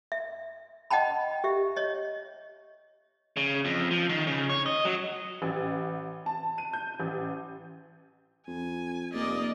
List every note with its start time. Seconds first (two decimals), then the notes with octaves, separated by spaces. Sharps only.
0.12 E5
0.91 D#5 F#5 G5 A5 B5
1.44 G4 E5
1.76 C#5 D#5
3.37 C#3
3.65 F2
3.91 F3
4.09 D#3
4.27 C#3
4.49 C#5
4.66 D#5
4.85 F#3
5.42 A1
6.26 A5
6.58 D#7
6.73 G6
7.00 A1
8.47 F2 G#5
9.14 F1 A#3 D5 D#5